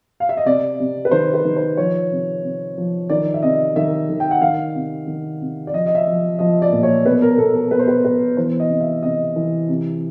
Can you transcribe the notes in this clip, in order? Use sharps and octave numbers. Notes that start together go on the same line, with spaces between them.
F5
E5
D#5
C3 D5
C3
B4
D#3 C5
B4
D#3
C5
F3 C#5
C3
C3
F3
D#3 D5
E5
C3 D#5
D#3 E5
D#3
G5
F#5
D#3 F5
C3
D#3
C3
D5
F3 D#5
D#5
E5
F3
F3 D#5
D5
A#2
C#5
B2 B4
A#4
B2 A4
A4
B2 B4
C5
B4
B2 B4
E3 C5
D#5
C3
E5
C3 D#5
E3
C3